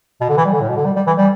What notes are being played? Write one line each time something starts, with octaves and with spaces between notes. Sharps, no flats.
B2
D3
E3
G3
D3
A2
B2
D3
G3
G3
E3
G3